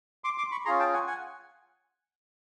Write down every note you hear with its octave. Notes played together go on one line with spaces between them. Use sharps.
C6 D6
C6 D6
B5 C#6
C#4 F4 G#4 A#5 C6
G5 A5
F#5 G#5
F#5 G#5